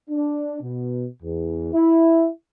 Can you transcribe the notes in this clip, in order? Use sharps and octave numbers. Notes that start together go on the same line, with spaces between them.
D4
B2
E2
E4